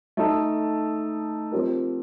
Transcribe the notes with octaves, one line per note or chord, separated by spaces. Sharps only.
A3 D#4 A4
F3 C4 G4 A#4